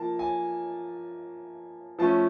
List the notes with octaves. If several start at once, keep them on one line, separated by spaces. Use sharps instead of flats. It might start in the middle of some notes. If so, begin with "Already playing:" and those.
Already playing: F3 A#3 A5
G#5
F3 A3 C#4 A5